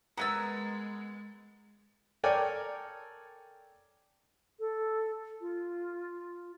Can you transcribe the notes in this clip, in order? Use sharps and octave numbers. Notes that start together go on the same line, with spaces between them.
G#3 B3 A#4 A#5 E6 G#6 A6
A4 A#4 C#5 D5 G5 G#5
A4
F4